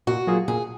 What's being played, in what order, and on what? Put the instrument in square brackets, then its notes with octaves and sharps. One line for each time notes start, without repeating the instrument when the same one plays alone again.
[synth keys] A#2 [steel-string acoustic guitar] F#4
[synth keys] F#3 A#3 F4 G#4
[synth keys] A#2 [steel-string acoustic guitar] G#4